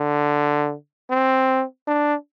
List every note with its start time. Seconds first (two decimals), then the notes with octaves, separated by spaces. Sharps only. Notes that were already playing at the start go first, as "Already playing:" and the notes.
Already playing: D3
1.10 C4
1.87 D4